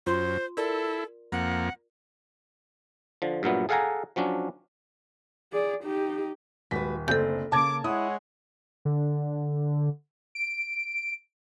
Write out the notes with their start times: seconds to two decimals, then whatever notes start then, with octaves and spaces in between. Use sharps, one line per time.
0.06 F#2 F4 C5 C6
0.57 E4 A4 A#4 D5
1.32 F2 A#3 F#5
3.22 D3 F3
3.43 G2 A#2 F#3 B3 E5
3.69 G#4 A4 F5 F#5 G#5 A#5
4.16 F3 F#3 C#4 D4
5.53 G#4 D5
5.84 D#4 G4
6.71 D#1 G#3 F#4 B4 B6
7.08 F#1 D2 C4 A4 G6
7.52 C#3 A#3 A5 D6 G#6
7.84 G#3 E4 C#5 F#5 D#6
8.85 D3
10.35 D7